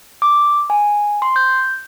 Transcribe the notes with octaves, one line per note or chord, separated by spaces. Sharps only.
D6
G#5
C6
G6